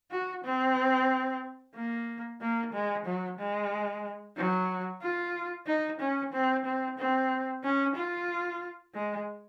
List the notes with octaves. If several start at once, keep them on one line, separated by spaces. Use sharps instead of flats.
F#4
C4
A#3
A#3
G#3
F#3
G#3
F#3
F4
D#4
C#4
C4
C4
C4
C#4
F4
G#3